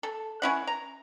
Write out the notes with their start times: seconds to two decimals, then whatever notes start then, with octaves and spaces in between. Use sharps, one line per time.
0.03 A4
0.42 C#4 E4 F#5
0.67 A#5